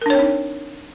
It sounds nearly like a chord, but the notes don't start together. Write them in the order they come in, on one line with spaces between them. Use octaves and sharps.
A#4 D4 C#5 C4 D#4